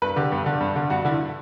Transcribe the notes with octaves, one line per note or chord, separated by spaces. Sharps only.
G2 B4
D3 G4
G2
D3
G2
D3
G2 F#4
D3 E4